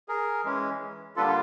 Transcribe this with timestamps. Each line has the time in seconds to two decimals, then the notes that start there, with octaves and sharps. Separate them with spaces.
0.08 G#4 A#4
0.44 E3 G#3 C#4
1.16 D3 G3 A#3 D4 F4 A4 B4